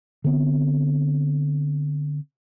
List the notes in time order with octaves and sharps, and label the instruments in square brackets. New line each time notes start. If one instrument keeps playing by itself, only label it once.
[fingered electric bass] D3 B3 C4